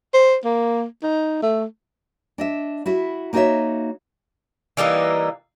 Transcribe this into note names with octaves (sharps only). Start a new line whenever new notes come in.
C5
A#3
D#4
A3
D4 D#5 E5
E4 F#4 E5
A#3 D#4 F#4 C#5 D#5 E5
E3 G3 A#3 D#4